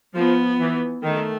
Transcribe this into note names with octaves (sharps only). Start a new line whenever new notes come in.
F3 B3
E3
D#3 A3